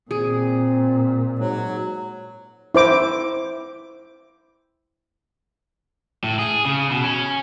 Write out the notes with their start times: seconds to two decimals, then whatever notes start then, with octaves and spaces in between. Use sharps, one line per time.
0.11 A#2 C4 G#4
1.39 G#2 F#3
2.75 E4 C5 D6
6.24 A2
6.39 G#4
6.65 C#3
6.91 B2
7.04 C#4